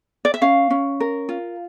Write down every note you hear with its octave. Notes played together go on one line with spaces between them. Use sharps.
D5
E5
C#4 F5
C#4
A#4
F4